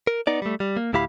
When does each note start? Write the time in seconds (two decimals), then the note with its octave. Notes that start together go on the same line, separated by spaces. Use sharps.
0.07 A#4
0.27 B3 D#4 D5
0.42 G3 A3
0.60 G3
0.77 A#3
0.93 D2 A2 E4 G4 F5 B5